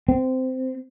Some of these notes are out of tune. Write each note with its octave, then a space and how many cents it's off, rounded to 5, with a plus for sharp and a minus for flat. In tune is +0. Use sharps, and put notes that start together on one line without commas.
C4 -15